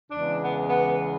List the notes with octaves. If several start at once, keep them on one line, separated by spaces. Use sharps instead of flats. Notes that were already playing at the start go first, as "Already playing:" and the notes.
E2 C#3 E3 G#3 D4
B3
B3